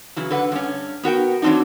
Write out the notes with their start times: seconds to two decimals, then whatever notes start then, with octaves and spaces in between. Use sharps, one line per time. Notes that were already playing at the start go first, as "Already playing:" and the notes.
0.16 C#3 E3 F#3
0.31 D3 B4 F#5
0.52 G2 C#4
1.03 B3 F#4 A#4 G5
1.42 E3 F#3 C4 D4 D#4